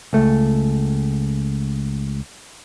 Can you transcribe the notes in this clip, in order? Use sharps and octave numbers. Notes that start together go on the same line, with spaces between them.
C#2 A3